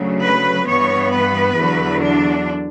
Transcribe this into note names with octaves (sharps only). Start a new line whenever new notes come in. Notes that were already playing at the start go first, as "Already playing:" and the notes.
Already playing: D2 C#3 F#3
B4
G2 E3 B3 C#5
B4
E2 D3 F#3
D4